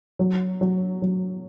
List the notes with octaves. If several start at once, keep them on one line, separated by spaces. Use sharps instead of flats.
F#3
F#3
F#3